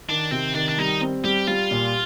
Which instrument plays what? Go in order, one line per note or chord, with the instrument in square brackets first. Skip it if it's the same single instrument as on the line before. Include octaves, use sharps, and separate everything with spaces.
[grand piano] D#3 [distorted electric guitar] D4
[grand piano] C3 [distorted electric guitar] C4
[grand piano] D#3 [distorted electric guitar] D4
[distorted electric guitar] D4
[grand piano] G3 [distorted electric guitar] D#4
[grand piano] C4
[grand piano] G3 [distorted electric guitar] G4
[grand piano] G3 [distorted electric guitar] F4
[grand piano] A#2